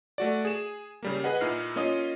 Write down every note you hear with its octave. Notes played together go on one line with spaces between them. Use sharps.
A3 F#4 D5
G#4 E7
C#3 G3 A#3
G#4 B4 D#5 F#5
A#2 D#4 E4 F6 C7
A#3 C#4 F4 D#5 D#6